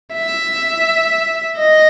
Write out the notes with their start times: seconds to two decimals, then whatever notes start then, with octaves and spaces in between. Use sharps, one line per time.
0.14 E5
1.59 D#5